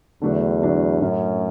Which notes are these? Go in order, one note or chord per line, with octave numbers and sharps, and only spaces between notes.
E2 D3 F#3 A3 D4
D3 F#3 A3 D4
F#2 A2 F#3 A3 C#4